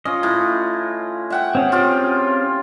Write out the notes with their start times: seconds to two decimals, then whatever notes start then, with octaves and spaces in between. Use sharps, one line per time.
0.05 C#4 F4 D#5
0.23 A2
1.30 E5 F#5 G5
1.55 C4 C#4 G#4
1.72 F4 G4 G5